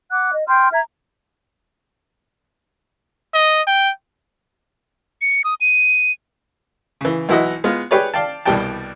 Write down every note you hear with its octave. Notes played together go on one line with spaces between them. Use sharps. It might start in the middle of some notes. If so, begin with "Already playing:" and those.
F#5 D6 F#6
D#5
G5 C6 F6 G6
E5 A#5 G#6
D#5
G5
C#7
D#6
D#7
C#3 E3
B1 E3 E4 F#4 D#5
G#3 B3 F4
G4 G#4 B4 C#5 D5
D5 F5 G5 A5
C2 B2 G3 D5 G5 A5